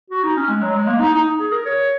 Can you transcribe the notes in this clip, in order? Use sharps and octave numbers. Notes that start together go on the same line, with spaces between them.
F#4
D#4
C#4
G#3
F#3
G#3
A#3
D#4
D#4
G#4
A#4
C#5